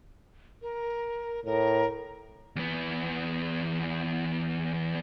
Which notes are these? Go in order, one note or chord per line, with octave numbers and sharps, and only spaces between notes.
A#4
A2 A#4
E2 B3